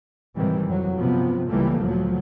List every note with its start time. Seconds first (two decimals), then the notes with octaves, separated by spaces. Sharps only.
0.36 G#2 C3 D#3 E3 G3
0.67 F2 F#3
0.99 G2 C3 F3 B3
1.49 C#2 C#3 E3 G3 A3 A#3
1.82 D2 A#2 F3 F#3